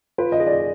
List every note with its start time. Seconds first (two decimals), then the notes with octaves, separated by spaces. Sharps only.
0.18 F4 B4
0.32 D#5
0.40 G#4
0.47 D5